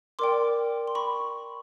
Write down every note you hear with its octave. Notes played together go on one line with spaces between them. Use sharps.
A#4 D5 G5 C6 D6
C6
B5 C#6